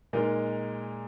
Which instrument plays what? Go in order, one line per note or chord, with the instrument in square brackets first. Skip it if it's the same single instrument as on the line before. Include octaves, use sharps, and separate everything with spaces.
[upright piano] A#2 G#3 D#4 A#4 D#5